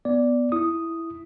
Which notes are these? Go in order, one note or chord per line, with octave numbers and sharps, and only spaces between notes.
B3 D5
E4 D#6